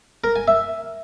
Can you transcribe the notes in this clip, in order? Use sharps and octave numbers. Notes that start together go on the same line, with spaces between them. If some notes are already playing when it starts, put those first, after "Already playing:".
A#4
G#5
E5